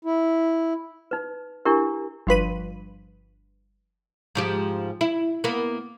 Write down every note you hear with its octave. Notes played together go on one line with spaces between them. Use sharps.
E4
D#4 B4
D4 E4 G4 A#4
G1 F3 B4 D#7
G#2 F3 G4
E4
A#3 B3